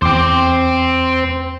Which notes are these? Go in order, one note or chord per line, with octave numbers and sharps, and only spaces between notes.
E2 C4 C5 D6